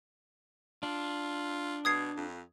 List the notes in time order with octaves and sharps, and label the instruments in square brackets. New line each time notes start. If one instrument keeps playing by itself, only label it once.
[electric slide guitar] D4 [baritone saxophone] F4
[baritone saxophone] B2 [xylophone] D#6 G#6 C7
[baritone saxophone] F2